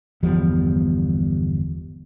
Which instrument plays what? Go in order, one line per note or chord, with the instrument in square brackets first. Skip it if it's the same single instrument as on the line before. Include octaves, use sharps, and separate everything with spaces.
[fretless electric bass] G1 E2 F3 G3